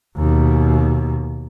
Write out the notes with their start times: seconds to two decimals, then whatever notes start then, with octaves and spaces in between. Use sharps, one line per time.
0.16 D#2 B2